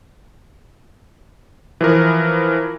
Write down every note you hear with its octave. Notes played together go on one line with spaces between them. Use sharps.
E3 F3 A#4